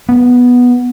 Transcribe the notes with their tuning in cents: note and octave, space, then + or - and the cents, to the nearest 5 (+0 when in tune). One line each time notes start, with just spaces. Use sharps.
B3 -5